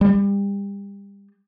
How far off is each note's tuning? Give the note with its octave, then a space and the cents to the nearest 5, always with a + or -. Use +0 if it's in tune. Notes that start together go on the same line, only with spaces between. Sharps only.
G3 +30